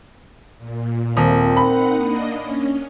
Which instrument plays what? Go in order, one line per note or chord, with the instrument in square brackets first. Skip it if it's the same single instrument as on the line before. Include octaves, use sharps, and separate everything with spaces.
[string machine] A#2
[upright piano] D#1 [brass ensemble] C4 A#4
[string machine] D#4 F#5 [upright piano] B5
[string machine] A#3 D4 D#5
C#4